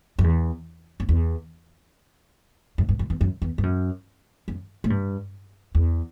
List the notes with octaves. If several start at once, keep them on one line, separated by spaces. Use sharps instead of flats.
F#2
E2
F#2
E2
F#2
G2
F#2
E2
F#2
E2
G2
F#2
F#2
A2
G2
E2